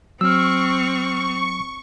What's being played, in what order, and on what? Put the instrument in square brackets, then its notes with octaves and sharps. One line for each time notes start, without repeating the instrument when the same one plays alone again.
[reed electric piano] F#3 [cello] C4 [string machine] C#6 [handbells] E6 F6